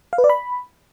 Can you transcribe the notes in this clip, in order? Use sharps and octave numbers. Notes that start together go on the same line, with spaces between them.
F5
B4
D5
B5